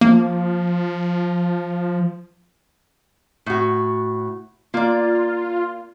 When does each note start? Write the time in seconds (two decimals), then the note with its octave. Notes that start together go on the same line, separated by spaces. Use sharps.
0.01 F3 A#3
3.46 A2 F#4
4.74 A#3 F4 D5